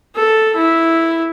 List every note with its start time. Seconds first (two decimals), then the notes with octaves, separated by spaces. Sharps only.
0.16 A4
0.56 E4